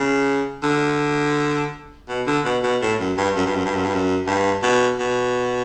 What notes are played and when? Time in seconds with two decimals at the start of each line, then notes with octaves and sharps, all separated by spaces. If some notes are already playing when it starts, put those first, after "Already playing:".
Already playing: C#3
0.63 D3
2.09 B2
2.27 D3
2.45 B2
2.63 B2
2.82 A2
3.00 F#2
3.18 G2
3.36 F#2
3.45 G2
3.55 F#2
3.65 G2
3.75 F#2
3.85 G2
3.94 F#2
4.27 G2
4.63 B2
4.99 B2